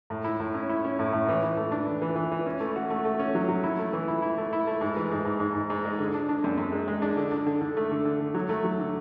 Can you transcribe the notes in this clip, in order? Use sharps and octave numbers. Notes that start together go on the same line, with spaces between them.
A2
E4
A2
C#4
E4
C#4
A2
A2
E3
E3
A3
D4
E3
E3
E3
E3
C#4
A3
F#4
A3
A3
C#4
F#3
F#3
E4
A3
E3
E4
E4
A3
E4
A3
G#2
E3
G#2
G#2
G#2
G#2
G#2
G#3
D3
D4
D4
F#2
F#2
G#3
G#3
D4
D3
D4
D3
D3
A3
D3
D3
D3
F#3
A3
F#3
D3